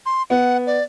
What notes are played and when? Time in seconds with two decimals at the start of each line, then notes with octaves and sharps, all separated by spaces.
0.06 C6
0.30 B3 F#5
0.67 D5